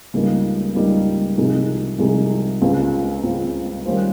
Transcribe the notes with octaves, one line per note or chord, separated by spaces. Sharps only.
C#2 C#3 G3 A#3 D#4
C#2 C#3 G3 A#3 D#4
C2 C3 F3 G#3 D#4
C2 C3 F3 G#3 D#4
C#2 C#3 G#3 C4 F4
C#2 C#3 G#3 C4 F4
D#3 G3 C#4 F4 C5